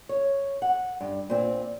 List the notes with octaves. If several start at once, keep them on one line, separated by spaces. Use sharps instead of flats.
C#5
F#5
G2
A#2 C4